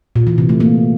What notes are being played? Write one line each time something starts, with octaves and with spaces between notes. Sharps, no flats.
A#2
E3
C3
A3
A#3